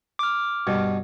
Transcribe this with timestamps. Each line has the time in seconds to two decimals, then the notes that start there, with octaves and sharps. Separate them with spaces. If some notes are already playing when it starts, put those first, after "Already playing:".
0.19 D6 F6
0.67 G2 B2